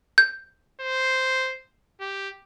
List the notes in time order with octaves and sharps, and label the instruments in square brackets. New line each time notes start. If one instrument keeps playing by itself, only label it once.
[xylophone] G6
[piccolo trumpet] C5
G4